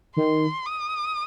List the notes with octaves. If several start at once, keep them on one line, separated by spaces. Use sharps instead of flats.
D#3 C6
D#6